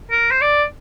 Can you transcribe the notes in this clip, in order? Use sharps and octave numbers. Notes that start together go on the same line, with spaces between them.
A#4
C5
D5